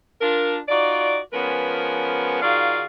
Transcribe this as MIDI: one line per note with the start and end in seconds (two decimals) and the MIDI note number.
0.21 0.58 62
0.21 0.58 65
0.21 0.58 70
0.69 1.18 63
0.69 1.18 65
0.69 1.18 66
0.69 1.18 74
1.33 2.41 53
1.33 2.41 56
1.33 2.41 59
1.33 2.41 61
1.33 2.41 70
1.33 2.41 71
2.42 2.84 51
2.42 2.84 65
2.42 2.84 66
2.42 2.84 68
2.42 2.84 74
2.42 2.84 77